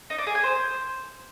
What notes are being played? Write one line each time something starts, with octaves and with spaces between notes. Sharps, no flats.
D#4
D4
G#4
G#5
C5